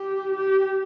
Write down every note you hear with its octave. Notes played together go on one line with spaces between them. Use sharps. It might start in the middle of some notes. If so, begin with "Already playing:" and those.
Already playing: G4
G4